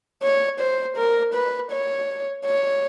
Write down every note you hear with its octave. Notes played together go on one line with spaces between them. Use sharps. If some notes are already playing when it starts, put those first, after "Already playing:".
C#5
C5
A#4
B4
C#5
C#5